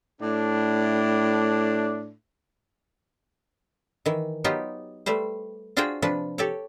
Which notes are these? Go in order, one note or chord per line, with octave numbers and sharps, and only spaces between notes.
A2 D4
D#3 E3
F#3 B3 D#4 F4 G4
G3 A3 B4 C5
D4 F4 F#4 G#4 C5 G5
C3 F3 D4 B4
G4 A4 C#5